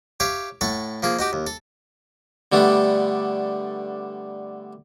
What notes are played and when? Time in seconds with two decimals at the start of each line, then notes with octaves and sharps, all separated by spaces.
0.20 G4 C#5 E5 F5
0.61 A2 A4 F#5 C#6
1.03 F3 A#3 G#4
1.19 D#4 F#4 G4
1.33 D#2
1.47 A4
2.52 D3 G3 A3 B3 D4